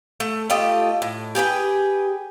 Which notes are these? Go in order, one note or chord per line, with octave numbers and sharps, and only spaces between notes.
A3
A3 F4 G4 D#5
A2
G4 G#4 B4 G5